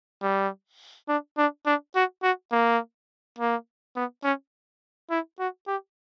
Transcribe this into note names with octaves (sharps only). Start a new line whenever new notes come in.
G3
D4
D4
D4
F#4
F#4
A#3
A#3
B3
C#4
E4
F#4
G4